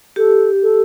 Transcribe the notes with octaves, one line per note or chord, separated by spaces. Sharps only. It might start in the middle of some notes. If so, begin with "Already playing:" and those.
G4 A4
A4